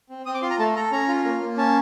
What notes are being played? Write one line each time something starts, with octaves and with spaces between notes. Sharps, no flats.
C4
C4 D#6
D6
F4 C6
A#5
A3 A5
A4 A#5
C#4 A#5
F4
A#3
A#3
C#4 A5